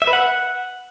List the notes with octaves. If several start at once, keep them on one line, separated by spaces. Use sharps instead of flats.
E5
B4
F#5